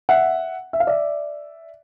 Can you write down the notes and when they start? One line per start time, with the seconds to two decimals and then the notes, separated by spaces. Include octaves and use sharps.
0.09 E5 F#5
0.73 E5
0.80 F5
0.87 D5 E5